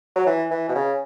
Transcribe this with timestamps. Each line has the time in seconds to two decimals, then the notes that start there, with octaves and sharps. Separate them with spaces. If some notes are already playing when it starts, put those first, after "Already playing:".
0.16 F#3
0.26 E3
0.51 E3
0.69 B2
0.75 C#3